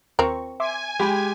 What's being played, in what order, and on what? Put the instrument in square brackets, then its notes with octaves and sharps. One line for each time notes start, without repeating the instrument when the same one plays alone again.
[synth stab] D#2 F4 C#6 [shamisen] C4 A#4
[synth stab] E5 C6 D6 [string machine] G#5
[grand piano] G#3 G4 [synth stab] G5 B5 D6